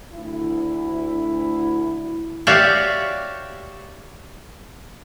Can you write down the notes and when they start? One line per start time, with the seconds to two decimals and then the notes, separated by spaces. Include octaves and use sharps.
0.13 D2 E4
2.47 F#4 G4 C#5 D5 E5 F5